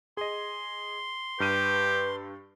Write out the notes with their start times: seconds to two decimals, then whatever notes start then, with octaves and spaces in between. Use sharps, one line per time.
0.17 G#4 D#5 C6
1.40 G2 G4 B4 F6 D#7